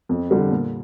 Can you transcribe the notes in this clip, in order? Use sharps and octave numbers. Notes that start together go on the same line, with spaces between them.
F2
D3 G3
A#2